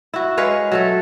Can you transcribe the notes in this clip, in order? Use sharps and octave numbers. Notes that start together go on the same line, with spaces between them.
E4 F#4
G#3 B4 C#5 F5
F#3 A3 A4